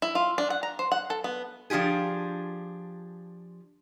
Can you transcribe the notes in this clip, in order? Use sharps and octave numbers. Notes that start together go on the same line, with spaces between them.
E4
F4
D4
F#5
A#5
C5
F#5
A4
B3
F3 D4 F4 G4 G#4